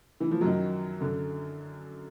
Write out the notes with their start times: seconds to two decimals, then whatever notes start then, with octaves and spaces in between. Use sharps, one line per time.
0.20 E3
0.31 F3
0.41 F#2 D#3 F#3
1.00 F#2 D3